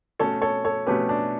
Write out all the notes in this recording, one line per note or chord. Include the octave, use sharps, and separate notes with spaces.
B2 A3 C#4 A4 C#5
A4 C#5
A4 C#5
B2 A3 C#4 G4 B4
D4